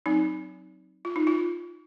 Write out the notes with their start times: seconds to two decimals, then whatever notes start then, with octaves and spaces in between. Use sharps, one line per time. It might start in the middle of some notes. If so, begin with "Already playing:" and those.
0.06 F#3 C4 D#4
1.05 F4
1.16 D#4
1.27 F4